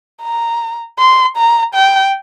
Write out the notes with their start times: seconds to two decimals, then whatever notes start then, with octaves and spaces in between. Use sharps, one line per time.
0.23 A#5
0.99 C6
1.37 A#5
1.75 G5